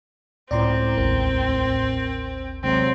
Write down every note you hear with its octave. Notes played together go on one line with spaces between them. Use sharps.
C#2 A2 C4 D5 A#5 C6
A1 D#2 A#4
C3 F#3 G#3 C4